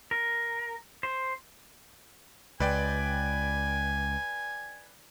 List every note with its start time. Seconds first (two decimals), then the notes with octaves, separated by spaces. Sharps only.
0.11 A#4
1.03 C5
2.60 C#2 B4 D5 G5 G#5